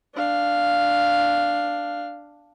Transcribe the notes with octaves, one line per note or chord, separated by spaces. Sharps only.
D4 F5